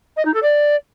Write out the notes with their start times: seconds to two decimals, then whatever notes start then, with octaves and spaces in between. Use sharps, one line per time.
0.17 D#5
0.25 D#4
0.34 A4
0.43 D5